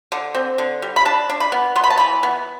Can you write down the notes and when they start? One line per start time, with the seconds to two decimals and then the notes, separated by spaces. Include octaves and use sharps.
0.12 D3
0.34 C4
0.58 D3
0.82 G3
0.96 B5
1.05 D4 A5
1.30 D4
1.40 B5
1.52 B3
1.76 B3 C6
1.84 B5
1.90 A5
1.98 E3 B5
2.23 B3